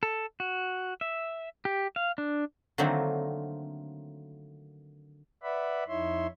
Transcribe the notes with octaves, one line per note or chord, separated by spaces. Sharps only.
A4
F#4
E5
G4
F5
D4
D3 D#3 F#3 A3 A#3 C4
B4 D5 E5 F#5 B5
F2 D#4 E4 C#5 E5 C6